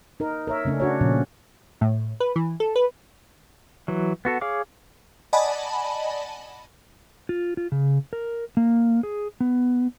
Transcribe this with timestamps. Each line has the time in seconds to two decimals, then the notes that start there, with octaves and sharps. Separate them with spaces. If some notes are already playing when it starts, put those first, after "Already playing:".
0.20 D#4 A#4
0.47 A#4 C#5 E5
0.65 C#3 A3 C#4 D4
0.80 D4 F#4 C#5
1.01 A#2 C#3 F3 C#4
1.81 A2
2.20 B4
2.36 E3
2.60 A4
2.76 B4
3.88 E3 F#3
4.25 B3 F#4 A4
4.41 G#4 C#5 F5 D6
5.33 D5 D#5 F#5 G#5 A5 B5
7.29 F4
7.57 F4
7.72 C#3
8.13 A#4
8.57 A#3
9.03 G#4
9.40 B3